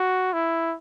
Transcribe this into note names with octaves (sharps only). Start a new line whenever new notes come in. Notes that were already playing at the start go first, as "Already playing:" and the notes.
Already playing: F#4
E4